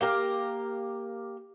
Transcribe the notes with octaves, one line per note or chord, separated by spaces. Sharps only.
A#3 G4 A#4